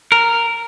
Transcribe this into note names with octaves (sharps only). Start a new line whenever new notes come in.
A#4